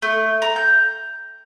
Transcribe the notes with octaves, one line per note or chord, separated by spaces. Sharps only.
A3
A#5
G6